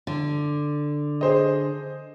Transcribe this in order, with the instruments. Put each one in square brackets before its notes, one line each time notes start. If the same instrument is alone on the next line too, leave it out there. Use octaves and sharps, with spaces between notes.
[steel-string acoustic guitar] D3
[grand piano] G#4 C5 D#5